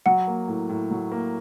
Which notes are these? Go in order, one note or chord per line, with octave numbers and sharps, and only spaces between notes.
F#3 F#5
A#3
A2
A2
F#3
A#3